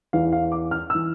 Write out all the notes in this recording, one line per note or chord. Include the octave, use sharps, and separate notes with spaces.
E2 E3 F5
F5
D6
F6
E3 E6